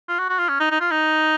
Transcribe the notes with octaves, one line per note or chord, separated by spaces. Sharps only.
F4
F#4
F#4
F4
C#4
D#4
D#4
F4
D#4